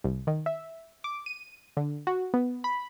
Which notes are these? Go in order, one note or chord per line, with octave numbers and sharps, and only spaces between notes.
C2
D#3
E5
D6
D#7
D3
F#4
B3
B5